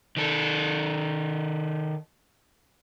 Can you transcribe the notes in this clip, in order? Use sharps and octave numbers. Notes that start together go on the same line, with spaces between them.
D#3 A4